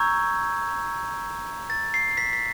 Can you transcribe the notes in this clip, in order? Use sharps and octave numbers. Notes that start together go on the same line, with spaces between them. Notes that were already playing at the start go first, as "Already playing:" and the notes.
Already playing: A#5 C#6 E6 G6 G#6
A6
C7
B6
B6